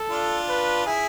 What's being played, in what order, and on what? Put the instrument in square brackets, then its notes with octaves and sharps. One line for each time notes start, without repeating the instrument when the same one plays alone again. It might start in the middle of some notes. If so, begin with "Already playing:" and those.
Already playing: [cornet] A4
[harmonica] D4 F4
[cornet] B4
[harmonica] E4 G#4